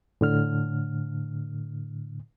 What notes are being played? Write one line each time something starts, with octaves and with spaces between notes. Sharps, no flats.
A2 D3 F6